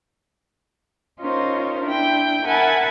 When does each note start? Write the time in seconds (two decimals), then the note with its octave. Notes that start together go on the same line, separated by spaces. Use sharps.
1.21 C#4 D#4 F4 A#4 C5
1.83 D4 E4 G5
2.45 A#4 E5 F#5 G#5 A5 B5